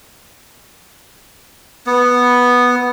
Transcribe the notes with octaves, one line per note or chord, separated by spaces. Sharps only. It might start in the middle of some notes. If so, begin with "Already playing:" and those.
B3